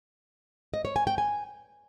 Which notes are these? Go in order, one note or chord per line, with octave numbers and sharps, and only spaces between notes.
D#5
C#5
G#5
G5
G#5